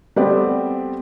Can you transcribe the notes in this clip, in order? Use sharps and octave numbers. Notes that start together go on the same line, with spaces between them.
G3 A3 B3 C4 G4 D5